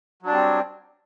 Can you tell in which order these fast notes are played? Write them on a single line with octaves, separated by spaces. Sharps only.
F#3 D4 G3 C4